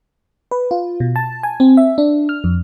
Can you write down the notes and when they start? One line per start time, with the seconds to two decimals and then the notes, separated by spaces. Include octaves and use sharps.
0.51 B4
0.71 F4
1.00 B2
1.16 A5
1.43 G#5
1.60 C4
1.77 E5
1.98 D4
2.29 F6
2.44 F2